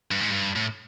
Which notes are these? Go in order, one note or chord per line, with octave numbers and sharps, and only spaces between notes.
G2
G#2
G2
A2